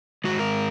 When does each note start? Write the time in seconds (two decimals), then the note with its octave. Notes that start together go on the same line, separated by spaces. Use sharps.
0.24 G#2 D#3 G#3 F#4
0.39 A#4